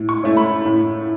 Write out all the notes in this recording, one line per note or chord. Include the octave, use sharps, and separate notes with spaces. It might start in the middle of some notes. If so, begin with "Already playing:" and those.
Already playing: A2
C#6
A3 C#4 E4
B5
A2